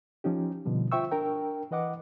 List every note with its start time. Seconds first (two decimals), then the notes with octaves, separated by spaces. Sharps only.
0.24 F3 C#4 D#4 G4
0.65 B2 D3 F3 G3
0.92 F4 C5 E5 G5 C#6 E6
1.12 D4 A#4 G5
1.71 E3 B4 D#5 F#5 D6